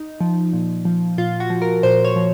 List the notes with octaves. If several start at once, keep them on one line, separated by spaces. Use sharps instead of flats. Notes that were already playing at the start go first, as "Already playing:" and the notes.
Already playing: D#4
F3
A#2
F3
A#2 F4
F#4
F3
A#4
A#2 C5
C#5
F3